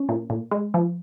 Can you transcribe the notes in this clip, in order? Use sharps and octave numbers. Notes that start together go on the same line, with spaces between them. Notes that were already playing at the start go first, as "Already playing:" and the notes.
Already playing: C#4
A#2
A#2
G#3
F3